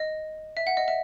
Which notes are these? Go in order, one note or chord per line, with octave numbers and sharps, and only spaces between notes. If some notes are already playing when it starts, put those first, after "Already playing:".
Already playing: D#5
E5
F#5
D#5
E5